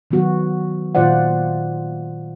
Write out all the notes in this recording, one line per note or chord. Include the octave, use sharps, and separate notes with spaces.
D#3 F#3 B3 F#4
A#2 D#3 F4 C5 D5 F#5